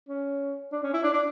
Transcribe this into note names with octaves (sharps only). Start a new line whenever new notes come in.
C#4
D4
C#4
E4
D4
D4